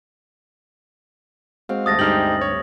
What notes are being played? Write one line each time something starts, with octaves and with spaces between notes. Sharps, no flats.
G#3 C4 F#4 F5
D2 G2 D#6 A6 A#6
G2 G#3 D#4 G4 G5 F6 F#7
C#5